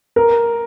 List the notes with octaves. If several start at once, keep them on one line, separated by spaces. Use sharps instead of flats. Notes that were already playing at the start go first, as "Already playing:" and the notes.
A#4